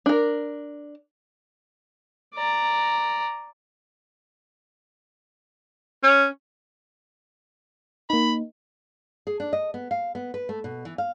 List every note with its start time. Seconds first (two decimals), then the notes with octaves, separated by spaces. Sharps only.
0.06 D4 A#4
2.35 D5 A#5
6.03 C#4
8.10 A#3 D#4 B5
9.27 G#4
9.40 D4
9.53 D#5
9.74 B3
9.91 F5
10.15 B3
10.34 B4
10.49 A3
10.64 B2
10.85 E3
10.98 F5